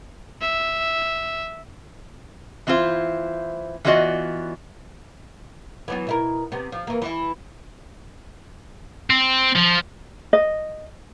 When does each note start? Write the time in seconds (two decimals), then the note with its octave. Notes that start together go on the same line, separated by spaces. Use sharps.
0.42 E5
2.67 E3 C4 E4 F4 C5
3.85 E3 B3 F4 F#4 D5 D#5
5.88 E3 F#3 B3
6.07 B2 E4 A#4
6.52 C3 B3
6.72 F3
6.87 E3 A#3
7.02 E3 E4
9.10 C4
9.56 F3
10.33 D#5